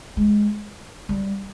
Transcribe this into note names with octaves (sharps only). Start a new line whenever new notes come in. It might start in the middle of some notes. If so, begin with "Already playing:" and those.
G#3
G3